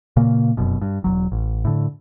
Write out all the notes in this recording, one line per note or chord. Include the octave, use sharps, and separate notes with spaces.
A#2 C#3 A#3
F1 F#2 B2
G2
E1 B1 F#3
A1
A2 D3